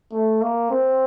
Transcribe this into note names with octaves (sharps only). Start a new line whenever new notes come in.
A3
A#3
C4